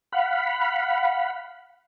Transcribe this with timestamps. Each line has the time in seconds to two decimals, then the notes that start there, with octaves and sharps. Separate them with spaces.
0.12 F5 F#5 B5